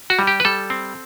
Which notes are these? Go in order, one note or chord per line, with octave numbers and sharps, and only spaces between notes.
F#4
G3
G4
B4
G3 A4
C4